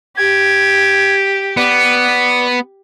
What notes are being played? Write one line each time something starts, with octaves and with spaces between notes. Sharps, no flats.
G4 G#6
B3 D5